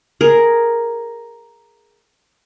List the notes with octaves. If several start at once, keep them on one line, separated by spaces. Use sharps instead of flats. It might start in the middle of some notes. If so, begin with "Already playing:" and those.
G#4 A#4